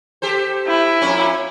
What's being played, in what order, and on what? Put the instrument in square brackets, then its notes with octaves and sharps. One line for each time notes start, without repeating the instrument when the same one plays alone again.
[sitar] G4 A4 C5
[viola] E4
[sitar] F2 A#2 C#4